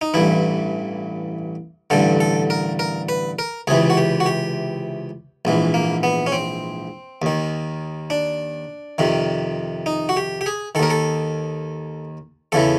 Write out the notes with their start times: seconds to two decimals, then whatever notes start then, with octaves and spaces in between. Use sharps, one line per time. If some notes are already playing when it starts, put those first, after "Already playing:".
0.01 D#4
0.14 A1 G2 E3 E4
1.90 A1 G2 D3 A4
2.20 A4
2.50 A#4
2.79 A#4
3.09 B4
3.39 A#4
3.67 C#2 C3 E3 G#4
3.90 F#4
3.97 G4
4.20 F#4
4.26 G4
5.45 A#1 G#2 E3
5.74 A#3
6.03 B3
6.26 C#4
6.32 C4
7.22 D#2 D#3
8.10 D4
8.98 F2 C3 D#3
9.86 D#4
10.09 F#4
10.17 G4
10.41 G4
10.46 G#4
10.75 D#3 A4
10.79 D#2 A#4
10.90 A4
12.52 E2 C#3 E3 A4